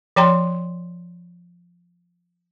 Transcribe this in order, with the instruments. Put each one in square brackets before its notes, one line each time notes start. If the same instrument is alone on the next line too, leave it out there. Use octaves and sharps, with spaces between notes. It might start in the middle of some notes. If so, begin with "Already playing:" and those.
[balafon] F3 C#5 G5 A#5 C6